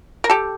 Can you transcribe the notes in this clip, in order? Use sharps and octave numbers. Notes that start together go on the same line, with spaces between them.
A#4
G4 A4